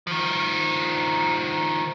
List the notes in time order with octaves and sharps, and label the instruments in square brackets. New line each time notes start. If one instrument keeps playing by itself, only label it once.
[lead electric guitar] D#3 F3